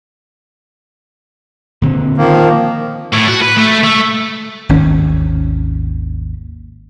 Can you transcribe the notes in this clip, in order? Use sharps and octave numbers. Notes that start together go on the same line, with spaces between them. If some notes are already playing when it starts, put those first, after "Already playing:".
A#2 D3 C4
D#3 F3 A#3
A2
F#4
B4
A3
A3
G#1 D#2 C#4